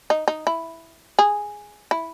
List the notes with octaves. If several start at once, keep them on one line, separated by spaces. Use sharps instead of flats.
D#4
D#4
E4
G#4
E4